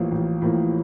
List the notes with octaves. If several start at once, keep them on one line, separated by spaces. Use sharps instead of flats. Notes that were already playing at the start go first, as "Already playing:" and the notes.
Already playing: A1 A2 F3 A#3
A1
A2 F3 A#3